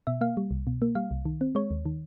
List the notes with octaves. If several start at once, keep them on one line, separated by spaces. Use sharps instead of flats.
B2 E5
A#3 F5
G3
C2
B2
A#3
G3 F5
C2
D#3
C4
G#3 C#5
D#2
D#3